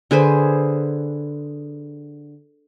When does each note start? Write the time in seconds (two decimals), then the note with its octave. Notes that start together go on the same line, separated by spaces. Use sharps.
0.11 D3 G#4 B4 C5